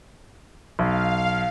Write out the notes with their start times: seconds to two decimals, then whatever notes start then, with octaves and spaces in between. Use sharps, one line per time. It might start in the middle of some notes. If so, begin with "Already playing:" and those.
0.79 B1 F5